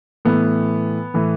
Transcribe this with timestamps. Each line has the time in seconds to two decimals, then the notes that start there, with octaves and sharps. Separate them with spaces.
0.25 A2 E3 B3
1.14 A2 E3